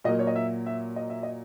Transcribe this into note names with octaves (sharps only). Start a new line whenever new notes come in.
A#2 F#3 A#3 D#5
C#5
D#5
E5
E5
D#5
E5
D#5